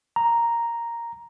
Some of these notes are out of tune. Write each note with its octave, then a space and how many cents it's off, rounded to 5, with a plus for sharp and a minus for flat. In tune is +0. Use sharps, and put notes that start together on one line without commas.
A#5 +0